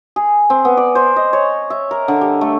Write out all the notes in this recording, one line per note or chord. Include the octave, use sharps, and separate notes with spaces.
G#4
C4
B3
D5
C5
D#5
C#5
E5
A#4
D3
G3
A3